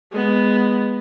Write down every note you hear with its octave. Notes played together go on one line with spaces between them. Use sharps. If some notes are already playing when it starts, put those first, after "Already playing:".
G#3 B3